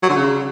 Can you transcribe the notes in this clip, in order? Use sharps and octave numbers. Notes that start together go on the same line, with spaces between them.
F#3
D3
C#3